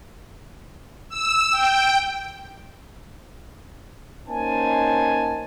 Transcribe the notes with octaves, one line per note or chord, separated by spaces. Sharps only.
E6
G5
A#3 C#4 D#4 C5 G#5 A5